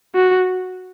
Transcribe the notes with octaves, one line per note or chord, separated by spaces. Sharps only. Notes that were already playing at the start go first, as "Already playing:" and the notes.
F#4